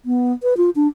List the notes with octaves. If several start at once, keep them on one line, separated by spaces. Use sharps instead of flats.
B3
B4
F4
D4